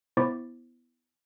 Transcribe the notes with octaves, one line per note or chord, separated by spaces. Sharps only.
B3 E4 C5 C#6 D6 A6